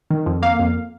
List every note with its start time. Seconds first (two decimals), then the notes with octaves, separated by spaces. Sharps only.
0.10 D#3
0.26 F2
0.42 A#3 F5
0.59 F2